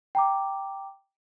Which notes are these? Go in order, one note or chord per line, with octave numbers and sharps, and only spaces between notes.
G5 A#5 D6